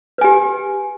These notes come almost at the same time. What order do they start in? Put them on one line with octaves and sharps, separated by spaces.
B4 G#5 G4